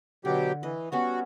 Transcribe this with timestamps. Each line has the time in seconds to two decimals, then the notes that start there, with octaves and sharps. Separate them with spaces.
0.25 B2 D3 F#3 G4
0.63 E3 D#5
0.92 G3 B3 C#4 F#4